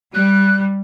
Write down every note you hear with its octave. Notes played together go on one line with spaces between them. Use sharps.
G3 F#6